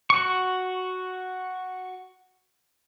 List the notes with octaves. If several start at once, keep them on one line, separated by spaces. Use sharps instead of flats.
F#4 C#6